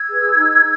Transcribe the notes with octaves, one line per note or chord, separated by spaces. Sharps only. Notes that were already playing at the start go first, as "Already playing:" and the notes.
Already playing: E6 G#6
G#4 B4
D#4